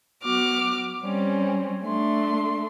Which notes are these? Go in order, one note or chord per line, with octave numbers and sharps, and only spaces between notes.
F#3 B3 F#4 D6 F6
G3 C4 C#4
A3 D4 C6